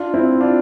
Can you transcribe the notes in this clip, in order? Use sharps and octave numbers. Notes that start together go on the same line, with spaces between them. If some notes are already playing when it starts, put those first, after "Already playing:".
Already playing: D4 F4
C4 E4
D4 F4